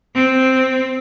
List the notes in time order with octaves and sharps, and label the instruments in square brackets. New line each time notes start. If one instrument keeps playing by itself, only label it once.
[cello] C4